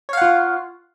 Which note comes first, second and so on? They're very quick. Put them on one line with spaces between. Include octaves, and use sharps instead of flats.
C#5 F5 F#5 F4